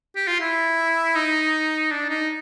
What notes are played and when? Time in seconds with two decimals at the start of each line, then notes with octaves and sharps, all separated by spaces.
0.16 G4
0.28 F4
0.40 E4
1.15 D#4
1.91 D4
2.09 D#4